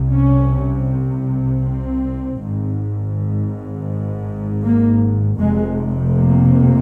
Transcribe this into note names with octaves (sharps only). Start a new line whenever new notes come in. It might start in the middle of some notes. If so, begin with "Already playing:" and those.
Already playing: C2 C3
C#4
C4
G#1 G#2
A#3
F1 F2 C3 G#3
A#3